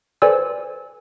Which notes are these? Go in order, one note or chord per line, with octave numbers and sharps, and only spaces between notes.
A4 B4 C5 D5 G#5 E6